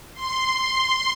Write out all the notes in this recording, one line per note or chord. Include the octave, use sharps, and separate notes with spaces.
C6